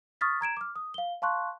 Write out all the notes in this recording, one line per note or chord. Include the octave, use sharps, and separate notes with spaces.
C#6 D#6 F6 A6 B6
A#5 G#6 D7 E7
D6 F6
D#6
F5 G7
F5 A5 C6 C#6 F#6